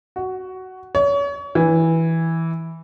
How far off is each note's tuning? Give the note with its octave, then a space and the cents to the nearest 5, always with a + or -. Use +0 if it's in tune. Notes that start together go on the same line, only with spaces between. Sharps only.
F#4 +10
C#5 +35
E3 -10